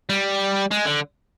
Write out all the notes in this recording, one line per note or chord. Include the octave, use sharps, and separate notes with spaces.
G3
G#3
D3